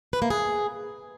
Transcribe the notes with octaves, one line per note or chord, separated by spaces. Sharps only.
B4
A#3
G#4